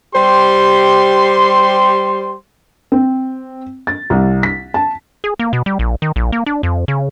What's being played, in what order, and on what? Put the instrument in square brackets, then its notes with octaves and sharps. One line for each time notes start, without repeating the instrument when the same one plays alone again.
[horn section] G3 G4 C5 C6
[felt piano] C4
A6
C2
B6
A5
[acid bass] G#4
A#3
B2
G3
A#1
D#3
A#1
A#3
D4
F2
C#3